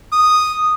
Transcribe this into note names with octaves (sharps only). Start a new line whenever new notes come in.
D#6